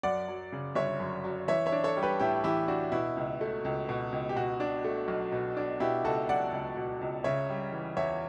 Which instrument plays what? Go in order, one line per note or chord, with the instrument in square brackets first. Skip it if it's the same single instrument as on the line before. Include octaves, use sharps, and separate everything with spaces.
[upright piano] F#2 [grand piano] D5 F#5
[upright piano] F#3
C#3
[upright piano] G1 [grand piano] C#5 E5
[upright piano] F#2
F#3
[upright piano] E3 [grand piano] C#5 E5
[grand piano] C#5 E5
[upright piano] D4
[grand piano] A4 C#5
[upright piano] G3
[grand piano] G4 B4
[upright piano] A2 [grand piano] E4 G4
[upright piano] E3 [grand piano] E4 G4
[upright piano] D4 [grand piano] F#4
[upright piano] B2 [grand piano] E4
[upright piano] C#2
A3
C#2
B2
C#2
[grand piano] G4
[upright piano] B2 [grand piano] F#4
[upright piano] D4
A3
B1
B2
D4
[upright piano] B2 [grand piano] E4 G4
[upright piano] C#2 [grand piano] F#4 A4
[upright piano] F#3 [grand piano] D5 F#5
[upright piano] C#2
B2
C#2
[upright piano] C#3 [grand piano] C#5 E5
[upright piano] G3
E3
[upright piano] E2 [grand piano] C#5 E5